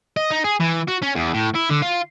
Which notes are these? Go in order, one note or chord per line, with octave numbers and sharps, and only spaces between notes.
D#5
D#4
G#4
E3
F#4
C#4
E2
A2
E4
D3
F4